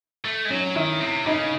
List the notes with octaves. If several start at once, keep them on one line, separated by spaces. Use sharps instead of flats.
A3
G#3
F#3 C#4
D#3 E4
C3
C#3 D#4